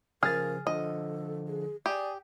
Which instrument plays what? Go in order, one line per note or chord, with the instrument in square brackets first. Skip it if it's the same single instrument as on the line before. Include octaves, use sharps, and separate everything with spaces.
[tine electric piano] C#3 F3 [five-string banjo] G#4 [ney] A#4 [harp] F6 A6
[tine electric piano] D3 F3 [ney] A4 [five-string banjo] D#5
[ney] G#4
[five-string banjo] G4 [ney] D5 [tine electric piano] G#5 D#6